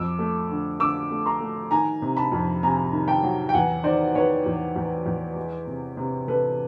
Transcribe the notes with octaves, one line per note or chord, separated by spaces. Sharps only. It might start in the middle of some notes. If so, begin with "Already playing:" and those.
Already playing: F2 D6 E6
A3
D3
D3 D6 E6
A3
A#5 C6
A3
D#3 G#5 A#5
C3
A5 B5
F2
C3 G#5 A#5
D#3
G5 A5
F#3
G5
E2 F#5 G#5
D#3 C5 D5
D#3 B4 C#5
E2
E2
E2
G#3
C3
C3
C3 A4 B4